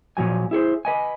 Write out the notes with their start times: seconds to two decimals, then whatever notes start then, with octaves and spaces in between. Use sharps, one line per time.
0.17 A#2 F3 F#3 G#5
0.51 E4 G#4 A4 C5
0.85 B4 D#5 G#5